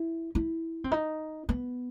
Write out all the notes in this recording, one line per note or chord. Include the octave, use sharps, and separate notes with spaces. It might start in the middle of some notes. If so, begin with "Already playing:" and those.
Already playing: E4
E4
C4
D#4
B3